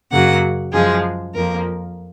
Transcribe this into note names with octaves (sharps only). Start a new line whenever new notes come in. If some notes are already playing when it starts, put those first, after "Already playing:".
F#2 C#3 F#3 A#3 F#5
F#2 F3 G#3 G#4
F2 F3 A#3 A#4